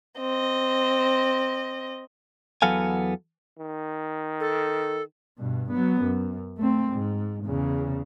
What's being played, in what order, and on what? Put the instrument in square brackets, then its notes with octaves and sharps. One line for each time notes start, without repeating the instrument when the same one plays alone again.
[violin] C4 D#5
[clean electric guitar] E2 F#3 B3 A4 F5 G#5
[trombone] D#3
[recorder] A4
[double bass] G2 B2
F#3 B3
F#2
A3 C4
G#2
E2 C#3